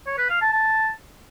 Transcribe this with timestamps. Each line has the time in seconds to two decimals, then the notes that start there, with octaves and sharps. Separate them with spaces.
0.06 C#5
0.18 B4
0.29 F5
0.41 A5
0.53 A5